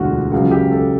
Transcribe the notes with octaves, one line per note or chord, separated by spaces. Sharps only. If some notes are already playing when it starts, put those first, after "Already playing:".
Already playing: E1 D2 D3 F4 F#4
C#2 C#3 F#3 F#4
G4
A4